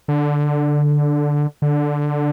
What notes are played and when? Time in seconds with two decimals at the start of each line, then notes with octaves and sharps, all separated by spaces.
0.08 D3
1.62 D3